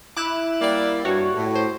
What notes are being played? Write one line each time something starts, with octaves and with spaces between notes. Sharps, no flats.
E4 D6 F#6 E7
G3 A#3 D5
G2 F#4 C#5
A2
C5